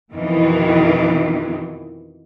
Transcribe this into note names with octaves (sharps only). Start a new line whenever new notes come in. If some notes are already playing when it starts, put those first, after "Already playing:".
F2 B2 D#3 E3